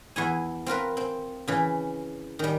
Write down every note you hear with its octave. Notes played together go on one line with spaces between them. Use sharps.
E2 E4 G#5
C4 F4 A#4 B4
C4
C#3 E3
D#3 G3